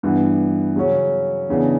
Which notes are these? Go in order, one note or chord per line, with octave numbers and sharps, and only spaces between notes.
G2 E3 B3
C#3 F#3 C#4
E2 C#3 E3 B3 D4